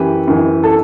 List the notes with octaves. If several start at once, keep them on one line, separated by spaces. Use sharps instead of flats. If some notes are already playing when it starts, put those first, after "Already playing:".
Already playing: F#2 E3 G4 B4
F#2 E3
A4